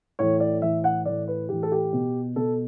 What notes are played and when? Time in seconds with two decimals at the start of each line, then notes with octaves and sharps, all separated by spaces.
0.19 A2 E3 C#5
0.40 D5
0.62 A2 E3 E5
0.84 F#5
1.05 A2 E3 D5
1.28 B4
1.49 A2 E3 G4
1.63 A4
1.72 G4
1.93 B2
2.36 B2 A4